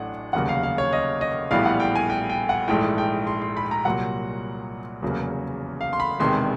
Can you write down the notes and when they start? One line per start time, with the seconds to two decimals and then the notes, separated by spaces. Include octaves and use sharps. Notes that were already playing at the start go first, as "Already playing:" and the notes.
Already playing: A1 A2 F#3 D4 F#5
0.33 F1 D#2 C#3 F#3 A#3 F#5
0.49 F5
0.63 F5
0.78 C#5
0.93 D#5
1.21 D#5
1.51 A#1 A2 E3 G3 B3 F5
1.66 F#5
1.80 G5
1.95 G#5
2.10 G5
2.30 G5
2.49 F#5
2.68 A#1 G#2 E3 A3 G5
2.98 G5
3.27 C6
3.42 C6
3.57 B5
3.71 A#5
3.85 C2 A#2 F#3 F#5
5.02 F1 E2 C#3 F#3 A#3
5.81 F5
5.93 C6
6.00 B5
6.20 E1 E2 C3 D#3 G#3 C6